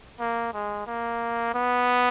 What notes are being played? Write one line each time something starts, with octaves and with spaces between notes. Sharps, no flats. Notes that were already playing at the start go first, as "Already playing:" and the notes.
A#3
G#3
A#3
B3